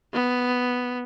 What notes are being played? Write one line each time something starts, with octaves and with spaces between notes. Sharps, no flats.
B3